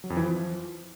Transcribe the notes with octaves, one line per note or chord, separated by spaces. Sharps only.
F#3
F2
E3
F3